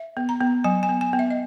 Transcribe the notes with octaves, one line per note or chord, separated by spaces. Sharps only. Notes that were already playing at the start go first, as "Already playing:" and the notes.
Already playing: E5
B3
A#5
B3
F#3 G#5
G#5
B3
G#5
B3
E5
D#5